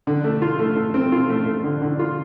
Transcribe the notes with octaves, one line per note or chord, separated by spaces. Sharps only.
D3
A3
F4
A3
A3
C4
F4
A3
A3
D3
D3
F4